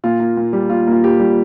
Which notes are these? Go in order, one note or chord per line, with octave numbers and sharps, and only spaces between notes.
A#2 F4
A#3
A#2
G3
A#2 F4
A#3
F4
A#2 G4
G3